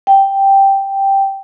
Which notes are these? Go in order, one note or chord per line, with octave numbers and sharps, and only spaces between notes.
G5